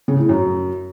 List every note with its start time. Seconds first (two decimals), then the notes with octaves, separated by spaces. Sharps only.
0.08 C#3
0.18 A2
0.29 F#2